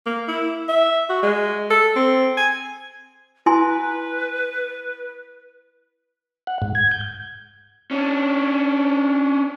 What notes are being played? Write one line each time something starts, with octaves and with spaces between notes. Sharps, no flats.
A#3
E4
E5
F#4
G#3
A4
C4
G#5
E4 B4 G#5 C6
F#5
G#2
G#6
G6
C#4 D4